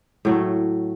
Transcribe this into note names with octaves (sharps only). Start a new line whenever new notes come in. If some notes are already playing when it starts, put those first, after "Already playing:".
A2 F#3 A3